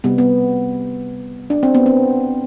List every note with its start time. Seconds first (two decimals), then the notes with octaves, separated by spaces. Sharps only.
0.04 C3 G3 B3
0.18 B3
1.50 D4
1.63 C4
1.74 B3
1.86 C4